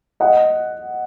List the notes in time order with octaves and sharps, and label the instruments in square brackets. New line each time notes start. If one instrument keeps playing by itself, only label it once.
[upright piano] D#5 F#5